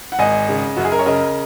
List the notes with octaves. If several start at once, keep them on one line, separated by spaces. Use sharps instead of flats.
F#5
G#1 D#5 G#5
C#3
F#2 F#4
G#4
A#4
C#5
C#3 A#4 D#5